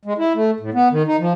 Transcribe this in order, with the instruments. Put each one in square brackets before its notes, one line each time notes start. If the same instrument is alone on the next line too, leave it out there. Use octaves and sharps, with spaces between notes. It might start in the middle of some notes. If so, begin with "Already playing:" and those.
[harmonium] G#3
E4
A3
A2
B3
D#3
D#4
F3